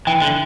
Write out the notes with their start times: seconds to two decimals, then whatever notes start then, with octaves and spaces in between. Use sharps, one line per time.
0.07 E3 G5
0.22 D3